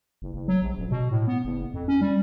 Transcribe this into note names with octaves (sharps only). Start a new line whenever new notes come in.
F#1
F#1
F#3
A#1
D#1
B2
A2
B3
F#1
F2
C#4
G3